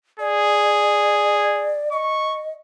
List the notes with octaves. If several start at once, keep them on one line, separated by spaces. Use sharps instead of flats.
G#4 D5
D#5 C#6